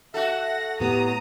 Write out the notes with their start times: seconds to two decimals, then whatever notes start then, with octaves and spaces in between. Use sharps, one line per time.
0.14 F#4 A4 E5 F#5 A#6
0.80 A2 B3 G4 A#5 D#6